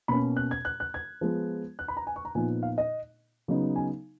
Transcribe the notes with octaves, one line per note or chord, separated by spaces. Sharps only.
B2 A#3 C#4 B5
F#6
G#6
F#6
F#6
G#6
F3 G#3 B3
F#6
B5
A#5
G#5
C#6
A#5
A#2 F3 B3 D#4 G#5
F5
D#5
C#3 F#3 B3 D#4
G#5